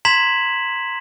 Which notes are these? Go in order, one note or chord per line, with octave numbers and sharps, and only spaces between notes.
A#5 C6 G#6 B6 E7 F#7